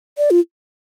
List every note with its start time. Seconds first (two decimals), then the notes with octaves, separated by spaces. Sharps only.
0.18 D5
0.31 F4